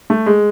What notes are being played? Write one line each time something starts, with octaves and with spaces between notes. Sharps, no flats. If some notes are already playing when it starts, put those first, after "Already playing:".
A3
G#3